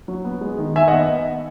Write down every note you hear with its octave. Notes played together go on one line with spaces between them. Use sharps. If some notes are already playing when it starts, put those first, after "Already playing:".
F#3
B3
G#3
D#3
D#3 E5 G#5
D#5 F#5
B3